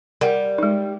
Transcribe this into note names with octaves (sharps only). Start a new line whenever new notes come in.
G3 A#4 F#5
G#3 D#4